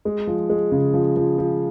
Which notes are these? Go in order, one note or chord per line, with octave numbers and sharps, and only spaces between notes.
G#3
F3
G#3
C#3
F3
F3
F3